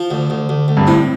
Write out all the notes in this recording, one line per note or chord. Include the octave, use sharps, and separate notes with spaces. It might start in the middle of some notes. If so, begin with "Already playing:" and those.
Already playing: F3
D2
D2
D2
D2
G2
A2 C4